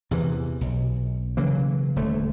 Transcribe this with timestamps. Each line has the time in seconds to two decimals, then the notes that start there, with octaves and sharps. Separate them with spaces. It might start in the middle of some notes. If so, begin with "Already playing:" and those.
0.11 E2 C3 E3
0.61 B1
1.37 C#3 E3 F#3 A#3
1.96 D#1 D3 A3